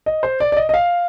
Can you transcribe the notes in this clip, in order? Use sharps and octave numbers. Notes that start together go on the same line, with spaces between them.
D#5
C5
D5
D5
D#5
D#5
F5